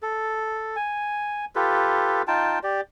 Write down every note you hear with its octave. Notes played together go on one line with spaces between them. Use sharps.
A4
G#5
F4 G4 A4 B4
D#4 F4 G5 A5
G4 D5